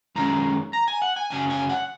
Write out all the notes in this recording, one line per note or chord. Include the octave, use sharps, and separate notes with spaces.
F#2 D#3 G#3 C#4 A#5
A#5
G#5
F#5
G#5
F#2 C#3 F#3 C#4 G#5
G#5
F#5